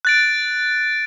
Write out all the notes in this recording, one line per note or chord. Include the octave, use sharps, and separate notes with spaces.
F#6 A6 D7